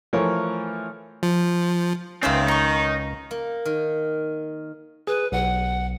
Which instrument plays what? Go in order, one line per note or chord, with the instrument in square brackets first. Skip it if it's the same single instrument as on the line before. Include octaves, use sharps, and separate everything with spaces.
[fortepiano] E3 F3 A3 A#4 C#5
[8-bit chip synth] F3
[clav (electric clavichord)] C#2 C#4 [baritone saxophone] D#3 [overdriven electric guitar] C4 [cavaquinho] B4 E5 F5
[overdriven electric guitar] D#4 [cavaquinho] A#5 C#6
[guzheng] A#3
D#3
[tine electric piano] G#4 [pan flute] B4
[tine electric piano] B1 [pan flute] F#5